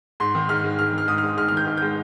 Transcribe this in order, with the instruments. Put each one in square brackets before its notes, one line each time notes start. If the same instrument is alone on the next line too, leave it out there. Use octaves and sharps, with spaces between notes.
[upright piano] G#2 C6
D#3
G#2 F6
G#3
G#2 F6
D#3 F6
G#2 D#6
F6
G#3
G#2 F6
F6
D#3 G6
G#2
G6
G#3